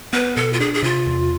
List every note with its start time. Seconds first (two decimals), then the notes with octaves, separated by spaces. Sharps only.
0.13 B3 B4
0.36 B2 A4
0.53 F4
0.60 D4 G#4
0.74 G#4
0.83 C3 F4
1.07 E2